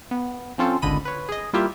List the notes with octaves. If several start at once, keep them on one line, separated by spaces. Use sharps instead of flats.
B3
F3 C4 C#4 F4 A4 C5
G#1 C#2 D3 D#5 B5 D#7
B4 C#5
G#4 D#5
G3 A#3 E4 F4 G4 E5